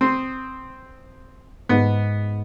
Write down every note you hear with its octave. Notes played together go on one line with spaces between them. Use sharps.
C4 D#6 C7 E7
G#2 B3